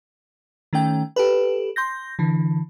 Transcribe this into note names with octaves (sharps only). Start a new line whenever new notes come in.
D#3 A3 C#4 G5
G4 A4 B4
C6 G6 A#6
D3 E3